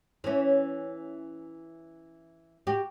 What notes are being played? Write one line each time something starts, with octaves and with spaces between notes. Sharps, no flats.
E3 C#4
F#4 G4